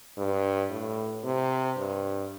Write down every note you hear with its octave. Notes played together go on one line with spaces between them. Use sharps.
G2
A2
C3
G2